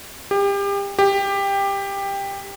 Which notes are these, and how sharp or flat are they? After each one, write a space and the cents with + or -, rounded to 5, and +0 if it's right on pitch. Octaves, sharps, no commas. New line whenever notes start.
G4 +30
G4 +15